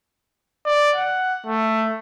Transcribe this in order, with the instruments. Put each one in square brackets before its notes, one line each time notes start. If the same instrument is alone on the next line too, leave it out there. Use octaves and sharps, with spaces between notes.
[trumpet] D5
F#5
A3